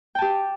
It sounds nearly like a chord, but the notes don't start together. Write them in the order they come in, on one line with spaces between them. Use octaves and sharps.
G5 A5 G4